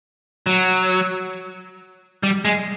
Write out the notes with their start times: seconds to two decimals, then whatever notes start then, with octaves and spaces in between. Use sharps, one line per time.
0.47 F#3
2.23 G3
2.45 G#3